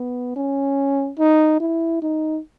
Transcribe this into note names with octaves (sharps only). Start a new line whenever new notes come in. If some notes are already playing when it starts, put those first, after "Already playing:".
Already playing: B3
C#4
D#4
E4
D#4